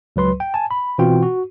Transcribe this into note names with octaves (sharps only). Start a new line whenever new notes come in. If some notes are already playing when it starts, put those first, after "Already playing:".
C#2 F#3 B4 C6
G5
G#5 A5
B5
B2 E3 C4 F4 F#4 G5
F#4